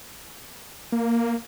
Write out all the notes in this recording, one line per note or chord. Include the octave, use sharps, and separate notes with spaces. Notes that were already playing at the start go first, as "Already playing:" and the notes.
A#3